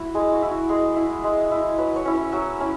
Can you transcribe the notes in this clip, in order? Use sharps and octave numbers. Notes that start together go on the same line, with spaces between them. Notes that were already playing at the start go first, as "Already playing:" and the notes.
Already playing: E4 F#4
G#3 G#4
F#4
E4
F#4
G#3 G#4
E4
G#3
E4
F#3 B4
C#5
C#4 E4
E5
F#3 E5
C#4 E4